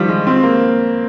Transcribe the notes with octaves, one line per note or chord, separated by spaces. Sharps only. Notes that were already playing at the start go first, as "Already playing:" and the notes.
Already playing: D#3 F3 G3
G#3
C4
A#3